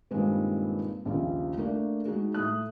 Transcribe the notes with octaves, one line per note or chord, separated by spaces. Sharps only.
G2 A#2 D#3 G3 G#3 C4
A#1 D#2 C#3 F3
A3 A#3 D4
G#3 D#4 F#4 G#4
A2 D#6 F#6